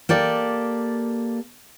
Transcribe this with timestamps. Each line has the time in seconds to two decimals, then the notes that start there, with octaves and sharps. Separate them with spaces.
0.09 A#3 G4 A4 D5